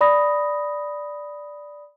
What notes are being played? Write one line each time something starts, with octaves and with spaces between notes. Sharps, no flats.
D5 B5 D#6 A#6